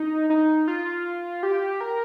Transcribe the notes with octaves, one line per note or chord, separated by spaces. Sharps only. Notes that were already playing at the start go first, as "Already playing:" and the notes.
Already playing: D#4
D#4
F4
G4
A#4